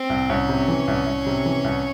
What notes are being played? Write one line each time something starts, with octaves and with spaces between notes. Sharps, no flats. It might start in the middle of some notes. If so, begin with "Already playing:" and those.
Already playing: C4
C2
C2 C#4
C3
E3
C2
C2
C3
E3
C2